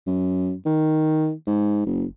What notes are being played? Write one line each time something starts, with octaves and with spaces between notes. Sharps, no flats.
F#2
D#3
G#2
F#1